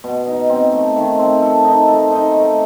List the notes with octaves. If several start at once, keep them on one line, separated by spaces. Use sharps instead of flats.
B2
D#4
C4
A3
D#3
C4
A4
D#4
A4
D#4
A3